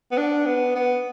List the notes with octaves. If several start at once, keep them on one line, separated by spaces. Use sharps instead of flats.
B3
D4
B3
B3